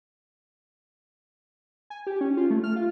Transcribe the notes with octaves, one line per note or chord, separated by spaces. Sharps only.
G#5
G4
C#4
F4
A3
F6
F4